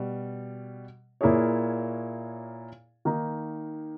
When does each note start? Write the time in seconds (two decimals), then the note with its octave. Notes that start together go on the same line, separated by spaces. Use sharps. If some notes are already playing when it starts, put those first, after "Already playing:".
Already playing: B2 G3
1.21 A#2 A#3 E4 G#4 C#5
3.05 D#3 A#3 D#4